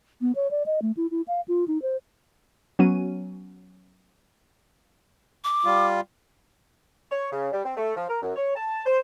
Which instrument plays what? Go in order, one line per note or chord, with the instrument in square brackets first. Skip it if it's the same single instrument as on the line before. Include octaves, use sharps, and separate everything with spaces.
[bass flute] B3
C#5
D5
D#5
A3
E4
E4
F5
F4
D#4
C5
[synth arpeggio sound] F#3 B3 C#4 D#7
[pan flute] D6
[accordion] G3 F4
[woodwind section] C#5
C#3
G3
C4
A3
F3
A#4
F#2
C#5
A5
C5